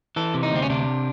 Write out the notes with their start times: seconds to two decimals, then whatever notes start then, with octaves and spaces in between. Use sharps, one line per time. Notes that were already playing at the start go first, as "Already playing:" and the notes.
0.16 E3 A4
0.34 C3
0.43 D#4
0.52 D2 C4
0.62 C#4
0.70 C3 D4